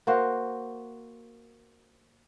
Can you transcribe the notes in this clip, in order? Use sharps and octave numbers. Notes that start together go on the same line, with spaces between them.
A#3 F#4 C5